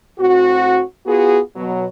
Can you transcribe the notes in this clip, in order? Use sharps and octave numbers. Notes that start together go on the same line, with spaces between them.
A2 C4 F#4
B3 F4 F#4 G#4
B2 F#3